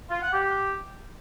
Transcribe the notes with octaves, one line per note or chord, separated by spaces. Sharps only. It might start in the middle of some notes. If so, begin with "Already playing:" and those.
F4
F#5
G4